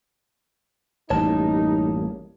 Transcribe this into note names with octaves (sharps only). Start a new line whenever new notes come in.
A1 F#2 G3 A#3 D#4 C#5 A5